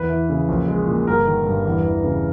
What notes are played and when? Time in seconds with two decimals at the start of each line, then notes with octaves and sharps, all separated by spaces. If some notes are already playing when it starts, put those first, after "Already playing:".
Already playing: E2 B4
0.09 E3
0.30 C#3
0.48 A#1
0.68 G#3
0.87 A#2
1.07 G1 A#4
1.26 D#3
1.46 G2
1.66 E2
1.85 E3
2.04 C#3